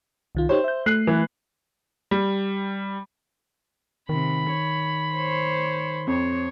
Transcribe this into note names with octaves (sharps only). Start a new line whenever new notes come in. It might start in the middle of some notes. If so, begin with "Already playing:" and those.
C2 D#3 F4
D#4 G4 C5 C#5
E5 G6
A3 F#6 C7
E3
G3
C3 D#3 B5
C#5
C5 C#5
F2 C5 C#5